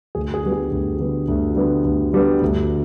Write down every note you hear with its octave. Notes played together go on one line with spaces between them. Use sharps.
D2 G#4
G#4
D3 G3 B3
G#4
D2
D3 G3 B3
D2
D3 G3 B3
D2
D3 G3 B3
D2